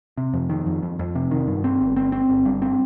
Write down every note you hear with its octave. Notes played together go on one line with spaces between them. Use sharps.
C3
F2
D#3
F2
F2
F2
C3
D#3
G2
C4
G1
C4
C4
G1
G2
C4